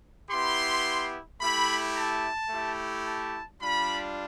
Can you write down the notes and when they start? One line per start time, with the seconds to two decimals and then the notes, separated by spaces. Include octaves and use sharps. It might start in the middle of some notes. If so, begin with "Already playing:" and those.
0.30 B3 E4 G4 C6
1.41 A3 E4 G4 B5
1.96 A5
2.51 A3 E4 G4
3.07 A5
3.61 G3 D4 F4 B5